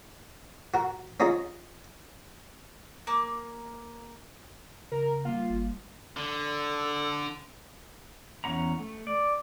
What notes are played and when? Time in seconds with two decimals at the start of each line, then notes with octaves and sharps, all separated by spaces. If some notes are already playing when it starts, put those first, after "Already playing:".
0.74 F#4 A#4
1.20 C#4 D#4 F4 G#4 C#5 A#5
3.07 A#3
4.92 C#3 A#4
5.25 G3 A#3 F4
5.50 G1
6.17 D3 A4
8.44 E2 B2 C#4 F#5 A#5
8.79 A3
9.07 D5